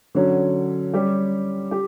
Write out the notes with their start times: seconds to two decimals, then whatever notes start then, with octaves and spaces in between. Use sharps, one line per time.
0.15 D3 F#3 C#4
0.94 G3 C#4 G4
1.71 G4